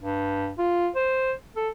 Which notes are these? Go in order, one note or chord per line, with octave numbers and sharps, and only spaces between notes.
G2
F4
C5
A4